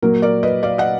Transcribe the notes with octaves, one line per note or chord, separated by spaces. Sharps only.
A#2 F#3 A#3 A#4
A#4 D5
B4 D#5
D5 F5
D#5 F#5